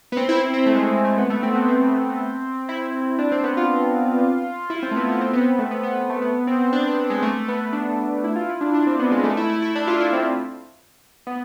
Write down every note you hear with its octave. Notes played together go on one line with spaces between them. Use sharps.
B3
C4
E4
E4
C4
A3
G#3
A3
G#3
A3
B3
A3
C4
B3
C4
E4
D4
C4
B3
F4
E4
C4
A3
B3
B3
C4
B3
A3
B3
B3
B3
A3
B3
C4
D4
D4
G#3
A3
B3
D4
E4
F4
E4
D4
D4
C4
B3
G#3
A3
E4
E4
E4
D4
F4
E4
C4
B3